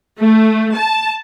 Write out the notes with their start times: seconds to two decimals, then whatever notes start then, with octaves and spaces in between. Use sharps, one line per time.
0.20 A3
0.76 A5